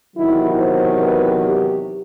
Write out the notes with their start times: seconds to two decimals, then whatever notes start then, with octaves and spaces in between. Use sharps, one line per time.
0.16 E2 C3 D#3 F#3 E4
0.58 C5
1.01 B4
1.45 G4